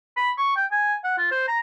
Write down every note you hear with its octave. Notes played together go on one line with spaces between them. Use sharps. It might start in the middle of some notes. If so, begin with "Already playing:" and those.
B5
C#6
G5
G#5
F#5
F4
C5
A#5